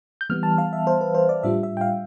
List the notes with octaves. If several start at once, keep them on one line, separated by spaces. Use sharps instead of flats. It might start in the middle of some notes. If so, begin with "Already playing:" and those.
G6
E3 G3 B3 F6
A5
F5
E5
C5
B4
C5
D5
A2 G3 D4 F4 E5
E5
G5
F5